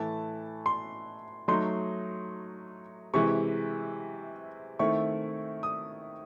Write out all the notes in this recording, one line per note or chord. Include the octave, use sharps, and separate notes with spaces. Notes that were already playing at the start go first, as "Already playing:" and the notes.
Already playing: A2 E3 A3 A5
C6
F#3 A3 D#4 C6
C3 E3 G#3 C#6
D#3 A3 C4 E4 C#6
D#6